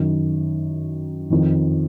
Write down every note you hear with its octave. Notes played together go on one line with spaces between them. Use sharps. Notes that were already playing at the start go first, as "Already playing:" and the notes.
Already playing: F#2 D#3
F2 D#3